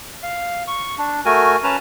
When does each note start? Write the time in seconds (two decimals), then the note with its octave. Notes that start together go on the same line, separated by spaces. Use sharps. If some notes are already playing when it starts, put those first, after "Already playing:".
0.23 F5
0.68 C#6
0.98 D4
1.25 A3 F#4 A#4 G#5
1.64 C#4 B4 A5 A#5